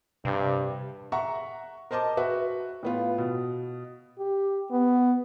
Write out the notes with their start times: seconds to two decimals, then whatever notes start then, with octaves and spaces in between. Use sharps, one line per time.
0.25 G2 C3
1.12 E5 F#5 A#5 C#6
1.91 A#4 C5 D#5 A5 D6
2.17 F#4 B4 E5
2.83 A2 B3 F4
3.18 B2
4.18 G4
4.71 B3